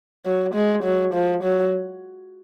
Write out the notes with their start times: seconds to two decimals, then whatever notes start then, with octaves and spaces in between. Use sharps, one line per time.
0.26 F#3
0.54 G#3
0.84 F#3
1.14 F3
1.44 F#3